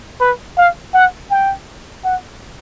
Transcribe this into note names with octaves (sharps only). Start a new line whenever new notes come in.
B4
F5
F#5
G5
F#5